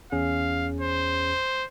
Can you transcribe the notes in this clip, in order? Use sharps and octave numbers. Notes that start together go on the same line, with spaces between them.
E2 C#4 G#4 F5
C5